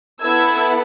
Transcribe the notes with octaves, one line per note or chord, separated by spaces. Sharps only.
B3 E4 A4 E6 G#6